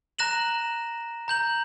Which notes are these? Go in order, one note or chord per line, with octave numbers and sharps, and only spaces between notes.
A#5 F#6 A#6 E7 F#7
A#5 G6 F#7